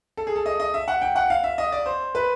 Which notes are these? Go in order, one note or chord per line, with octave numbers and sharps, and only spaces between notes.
A4
G#4
A4
D#5
D#5
E5
F#5
G5
F#5
F5
E5
D#5
D5
C5
B4